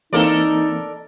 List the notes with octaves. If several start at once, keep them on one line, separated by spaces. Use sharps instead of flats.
E3 A#3 C4 D#4 A4 A#4 D5